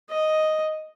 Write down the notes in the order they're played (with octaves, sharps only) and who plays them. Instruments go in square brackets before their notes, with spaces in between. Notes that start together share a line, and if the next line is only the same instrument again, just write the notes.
[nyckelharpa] D#5